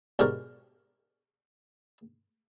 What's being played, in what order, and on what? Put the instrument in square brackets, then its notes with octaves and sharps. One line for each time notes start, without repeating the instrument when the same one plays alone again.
[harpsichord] B1 G#2 D3 G4 A#4 C#6